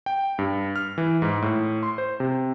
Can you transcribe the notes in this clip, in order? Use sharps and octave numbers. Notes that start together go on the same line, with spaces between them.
G5
G2
F6
E3
G#2
A2
C6
C5
C3